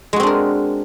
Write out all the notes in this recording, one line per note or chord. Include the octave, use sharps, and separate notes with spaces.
G#3 C4 D4 F#4 A#4